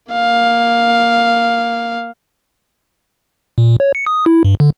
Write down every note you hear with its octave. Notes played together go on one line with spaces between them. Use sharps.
A#3 F5
A#2
C#5
C#7
D#6
E4
G2
D3